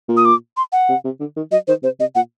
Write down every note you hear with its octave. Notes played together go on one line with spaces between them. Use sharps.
A#2
D#6
D6
C6
F#5
C3
C3
D3
D#3
F#3 D#5
D#3 C5
C3 C5
C3 D#5
A#2 F#5